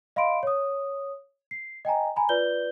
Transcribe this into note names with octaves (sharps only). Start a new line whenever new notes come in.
D#5 F5 B5 C6 D7
C#5 D#6
C7
D#5 G5 G#5 A#5
G#5 A#5 B5
F4 B4 D5 G6 G7